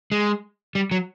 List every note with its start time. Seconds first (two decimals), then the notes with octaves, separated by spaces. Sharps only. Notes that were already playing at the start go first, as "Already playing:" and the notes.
0.12 G#3
0.75 G3
0.91 F#3